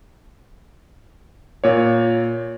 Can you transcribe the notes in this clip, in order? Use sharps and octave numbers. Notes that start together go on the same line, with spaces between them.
A#2 C#5